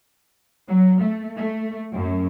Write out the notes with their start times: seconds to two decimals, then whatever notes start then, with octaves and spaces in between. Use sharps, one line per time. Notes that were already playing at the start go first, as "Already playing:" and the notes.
0.68 F#3
1.01 A3
1.36 A3
1.93 F#2